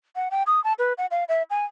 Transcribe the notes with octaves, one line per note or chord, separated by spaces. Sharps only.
F#5
G5
D#6
A5
B4
F#5
F5
E5
G#5